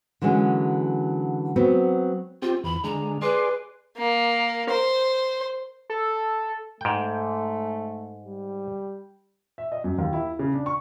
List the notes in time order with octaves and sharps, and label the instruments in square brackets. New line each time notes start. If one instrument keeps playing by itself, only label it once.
[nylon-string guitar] D3 E3 F#3 G#3 C4 C#4
F#3 B3 C4
[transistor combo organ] C4 G4 [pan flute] F4
[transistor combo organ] E2 [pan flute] B5
[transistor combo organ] D3 G#3 [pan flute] A#5
[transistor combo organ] G#4 D5 C6 [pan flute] B4
[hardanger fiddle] A#3
C5
[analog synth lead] A4
[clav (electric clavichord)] G#2 G5 [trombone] A3
[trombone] G3
[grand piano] E5
D#5
F#2
D#2
E4
C#3
D4
C#6